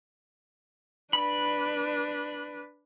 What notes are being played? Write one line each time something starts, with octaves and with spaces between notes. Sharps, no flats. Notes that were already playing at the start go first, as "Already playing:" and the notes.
D4 B4 B5